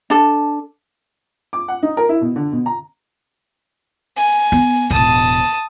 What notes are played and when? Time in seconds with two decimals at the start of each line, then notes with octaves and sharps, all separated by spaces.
0.10 D4 A4
1.53 D6
1.68 F#5
1.83 D#4
1.97 A#4
2.09 E4
2.21 B2
2.36 D3
2.52 B2
2.66 A#5
4.17 G#5
4.52 B3
4.90 E1 A2 A5 D#6